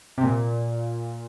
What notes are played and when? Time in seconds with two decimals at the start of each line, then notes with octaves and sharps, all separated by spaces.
0.18 C3
0.23 A#2